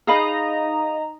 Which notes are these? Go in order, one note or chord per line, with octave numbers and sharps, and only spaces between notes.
D#4 G#4 D#5 F5 A#5 B5